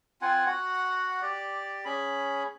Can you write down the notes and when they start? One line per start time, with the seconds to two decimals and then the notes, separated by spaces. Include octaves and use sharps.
0.22 C4 F4 F#5 G#5
0.47 F#4 F#5
1.22 G4 D5
1.85 C#4 G#4 B5